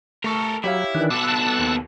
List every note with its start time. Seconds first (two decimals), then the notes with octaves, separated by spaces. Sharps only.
0.24 A3 A4 A#4 C#6
0.64 F#3 E4 G4 C#5 F5
0.95 D#3 E3 D4
1.10 B2 A4 A5 D6 E6 F#6
1.59 D#2